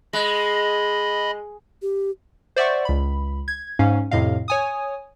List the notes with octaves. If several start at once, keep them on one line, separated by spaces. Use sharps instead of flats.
G#3 D#5 B5
G4
C5 D5 E5 F#5 C#6
C#2 B5
G#6
G#2 C#4 F5
F2 A2 C3 D#5 F5
C#5 G#5 D#6